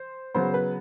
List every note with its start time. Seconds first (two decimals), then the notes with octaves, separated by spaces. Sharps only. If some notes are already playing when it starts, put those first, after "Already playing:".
Already playing: C5
0.34 C#3 F#3 B3 C5
0.54 B4